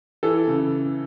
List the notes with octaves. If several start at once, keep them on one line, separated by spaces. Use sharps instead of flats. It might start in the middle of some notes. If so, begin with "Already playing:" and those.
E3 A4
C#3